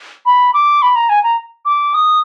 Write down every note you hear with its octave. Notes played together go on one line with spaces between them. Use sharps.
B5
D6
B5
A#5
G#5
A#5
D6
D#6